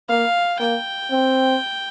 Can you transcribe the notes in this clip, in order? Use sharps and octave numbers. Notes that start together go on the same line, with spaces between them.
A#3 F5
A#3 G5
C4